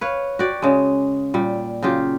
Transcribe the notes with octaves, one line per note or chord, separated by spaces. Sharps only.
B4 C#5 F5
F#4 G4 D5
C#3 G#3
A#2 G3
C#3 F#3 F4 G4